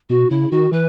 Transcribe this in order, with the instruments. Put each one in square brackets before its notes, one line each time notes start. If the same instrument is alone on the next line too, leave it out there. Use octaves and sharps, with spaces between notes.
[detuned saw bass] B2 [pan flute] F#4
[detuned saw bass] C#3 [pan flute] E4
[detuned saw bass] D#3 [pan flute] F#4
[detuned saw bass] E3 [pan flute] B4